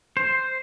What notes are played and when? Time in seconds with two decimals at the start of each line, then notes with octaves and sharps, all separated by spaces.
0.17 C5